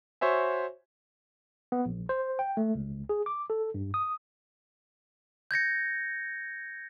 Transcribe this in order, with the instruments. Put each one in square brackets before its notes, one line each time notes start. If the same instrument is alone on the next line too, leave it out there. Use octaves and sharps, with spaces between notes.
[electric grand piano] F#4 C5 C#5 E5 G#5
[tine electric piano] B3
A#1
C5
G5
A3
C#2
G#4
D6
A4
G2
D#6
[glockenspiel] G6 G#6 A#6 C#7